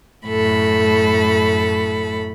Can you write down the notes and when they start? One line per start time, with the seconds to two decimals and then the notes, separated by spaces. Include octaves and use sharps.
0.25 F#2 A2 A4 B5